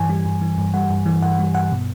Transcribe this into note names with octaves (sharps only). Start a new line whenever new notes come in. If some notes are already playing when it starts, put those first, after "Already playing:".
Already playing: G2 E3 G#5
G3
G2
E3
G2
G3 F#5
G2
E3
G2 F#5
G3
G2 F#5
B2